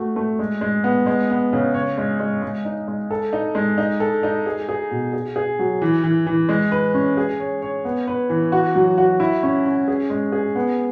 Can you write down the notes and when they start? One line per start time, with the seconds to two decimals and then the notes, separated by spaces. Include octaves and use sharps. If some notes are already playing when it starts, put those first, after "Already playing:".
Already playing: A3 F#4
0.16 A3
0.39 G#3
0.61 G#3
0.84 B3
1.06 G#3
1.30 B3
1.53 C#3
1.74 C#5
1.98 G#3
2.20 G#3
2.42 G#3
2.65 D#4
2.88 G#3
3.11 A4
3.33 D#4
3.55 G#3
3.78 D#4
4.00 A4
4.23 D#4
4.46 G#4
4.69 G#4
4.91 B2
5.13 G#4
5.36 G#4
5.59 F#3
5.82 E3
6.04 E3
6.27 E3
6.49 G#3
6.72 B4
6.94 C#4
7.17 G#4
7.40 C#5
7.62 C#5
7.85 B3
8.07 B4
8.30 E3
8.52 F#4
8.75 F#3
8.98 F#4
9.20 E4
9.43 C#4
9.65 C#4
9.88 G#4
10.10 G#3
10.32 G#4
10.55 B3